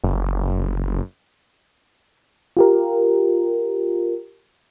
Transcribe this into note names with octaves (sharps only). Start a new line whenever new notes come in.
F#1
F4 G4 A#4